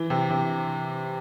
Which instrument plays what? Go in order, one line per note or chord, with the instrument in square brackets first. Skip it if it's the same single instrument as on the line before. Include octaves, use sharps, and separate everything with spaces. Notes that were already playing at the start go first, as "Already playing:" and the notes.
Already playing: [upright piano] E3
C3
C3